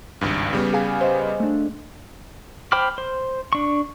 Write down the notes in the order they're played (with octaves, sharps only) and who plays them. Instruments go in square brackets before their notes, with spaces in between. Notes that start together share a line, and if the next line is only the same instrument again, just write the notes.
[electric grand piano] G#1 C#2 G2
C#3 G3 B3
[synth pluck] G#4 F5 G#5
C5 D#5
A3 D4
[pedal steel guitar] C5 G5 B5 D6 F6
C5
D4 C#6